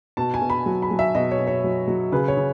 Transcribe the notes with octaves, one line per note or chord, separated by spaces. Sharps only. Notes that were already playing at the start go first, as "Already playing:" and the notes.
B2 A5
G#5
B2
B5
F#3
B5
F#3
E5
B2 D#5
C#5
B2
C#5
F#3
F#3
C#3 B4
C#5
C#3